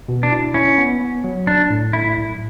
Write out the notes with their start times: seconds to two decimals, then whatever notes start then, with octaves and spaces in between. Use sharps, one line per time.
0.09 B2
0.23 D4
0.31 E4
0.54 C#4 E4
0.78 B3
1.01 B3
1.24 F#3
1.47 B1 D4
1.70 A2
1.93 A2 E4
2.17 B1